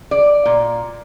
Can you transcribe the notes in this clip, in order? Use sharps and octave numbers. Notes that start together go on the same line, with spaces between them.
D5
A#2